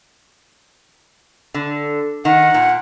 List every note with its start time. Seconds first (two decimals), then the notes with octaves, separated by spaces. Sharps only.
1.54 D3
2.25 D#3 F#5
2.54 A#2